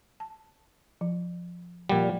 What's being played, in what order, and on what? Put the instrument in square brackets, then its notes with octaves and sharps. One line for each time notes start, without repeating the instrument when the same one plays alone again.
[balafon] A5
F3
[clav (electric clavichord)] A#2 G3 [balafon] F3 D5 F#5